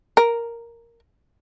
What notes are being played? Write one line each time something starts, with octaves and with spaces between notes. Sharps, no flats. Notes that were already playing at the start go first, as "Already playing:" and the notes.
A#4